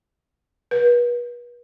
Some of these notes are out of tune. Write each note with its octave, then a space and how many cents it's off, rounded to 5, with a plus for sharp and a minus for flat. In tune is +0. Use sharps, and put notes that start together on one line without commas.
B4 -35